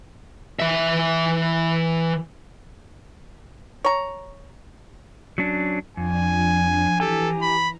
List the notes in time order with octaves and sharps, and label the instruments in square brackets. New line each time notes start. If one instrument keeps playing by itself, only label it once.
[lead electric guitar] E3 E5
[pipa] C#5 A#5
[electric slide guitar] F#3 C#4 D4
[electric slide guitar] F2 [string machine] F3 D4 [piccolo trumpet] G#5
[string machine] E3 A#5 [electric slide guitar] G4 G#5 [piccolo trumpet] A4
[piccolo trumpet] B5